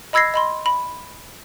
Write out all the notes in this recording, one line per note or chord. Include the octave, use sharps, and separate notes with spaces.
D#5 B5 E6 G#6 A#6 C7
D#5 B5 C6
B5